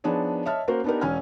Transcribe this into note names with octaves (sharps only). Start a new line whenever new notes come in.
F3 B3 D4 D#4 G#4 C#5
C#5 D#5 E5 A5 F6
A#3 C#4 F#4 A#4 C5 F#5
B3 D4 D#4 G4 A#4
E1 C#4 G#5 F6